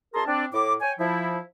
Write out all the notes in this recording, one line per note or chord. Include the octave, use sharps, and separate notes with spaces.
F#2 G#4 A#4 A5 A#5 C6
C4 D4
A2 D6
C#5 G5 G#5
F3 E4